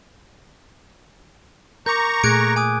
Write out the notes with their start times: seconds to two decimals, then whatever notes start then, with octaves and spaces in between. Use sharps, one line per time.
1.86 A#4 A#5 C#6 D6 G6
2.24 A#2 A3 G#4 F#6 G#6 D7
2.56 G#5 D6 D#6